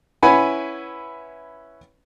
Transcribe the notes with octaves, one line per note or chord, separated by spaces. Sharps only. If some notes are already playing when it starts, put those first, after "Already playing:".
C#4 E4 B4 F#5 G#5 B5